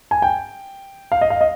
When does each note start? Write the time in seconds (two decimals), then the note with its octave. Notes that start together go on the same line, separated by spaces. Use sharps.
0.11 G#5
0.22 G5
1.12 F5
1.21 D#5
1.30 F5
1.41 D#5